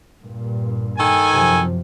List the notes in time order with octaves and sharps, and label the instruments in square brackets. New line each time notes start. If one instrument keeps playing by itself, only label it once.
[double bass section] G2 A#2
[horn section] D#3 A4 G#5
[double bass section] F#2 C3 F3